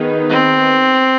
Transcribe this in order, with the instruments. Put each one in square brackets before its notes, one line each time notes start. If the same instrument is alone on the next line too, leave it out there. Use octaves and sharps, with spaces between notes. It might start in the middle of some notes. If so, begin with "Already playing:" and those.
Already playing: [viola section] D#3 B3 D#4 G#4 B4
[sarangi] C4